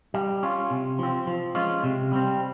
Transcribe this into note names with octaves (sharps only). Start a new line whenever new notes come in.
G3
C#4 F4
C3
F3 C4
F3
G#3 C#4 F4
C3
G3 C4